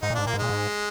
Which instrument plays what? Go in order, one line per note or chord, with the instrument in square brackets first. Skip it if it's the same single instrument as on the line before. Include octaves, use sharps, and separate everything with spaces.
[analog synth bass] G#2 [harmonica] D#4
[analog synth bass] A#2
[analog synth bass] G#2 [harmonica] D4
[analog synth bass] A#2 [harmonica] A#3
[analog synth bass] G#2
[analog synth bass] A#2 [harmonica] G#3
[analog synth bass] G#2